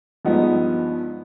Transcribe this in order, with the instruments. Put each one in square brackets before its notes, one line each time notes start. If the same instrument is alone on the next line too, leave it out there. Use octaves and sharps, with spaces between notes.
[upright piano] G2 F3 G#3 B3 D#4